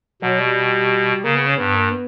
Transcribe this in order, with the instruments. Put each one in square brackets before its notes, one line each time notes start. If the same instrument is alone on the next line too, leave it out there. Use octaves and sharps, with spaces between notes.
[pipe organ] B2 [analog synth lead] F#3
[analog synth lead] G3
[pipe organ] C#3 [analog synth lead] A#3
[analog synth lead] B3
C#4
[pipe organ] G2 [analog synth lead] B3
[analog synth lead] A#3
B3